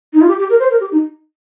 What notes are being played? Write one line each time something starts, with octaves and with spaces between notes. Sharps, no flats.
D#4
F4
G4
G4
A#4
C5
A#4
G4
D#4